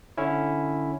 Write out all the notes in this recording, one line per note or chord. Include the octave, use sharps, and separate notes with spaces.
D3 C#4 E4